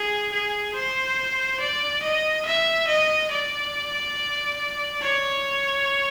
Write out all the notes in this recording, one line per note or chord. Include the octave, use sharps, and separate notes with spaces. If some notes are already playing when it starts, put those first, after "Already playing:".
Already playing: G#4
G#4
C5
D5
D#5
E5
D#5
D5
C#5